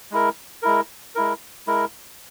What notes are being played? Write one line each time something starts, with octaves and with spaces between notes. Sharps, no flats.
G#3 E4 A#4
G#3 E4 A#4
G#3 E4 A#4
G#3 E4 A#4